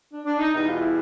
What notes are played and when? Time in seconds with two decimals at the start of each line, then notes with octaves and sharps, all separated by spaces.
0.11 D4
0.25 D4
0.38 D#4
0.53 E2 B2 G3 D#4
0.66 F4
0.80 E4